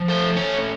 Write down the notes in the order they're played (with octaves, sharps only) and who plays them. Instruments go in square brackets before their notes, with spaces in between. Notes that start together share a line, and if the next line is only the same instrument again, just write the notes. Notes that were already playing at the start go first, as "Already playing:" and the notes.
Already playing: [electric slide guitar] F3
A3 C5
C#4 C#5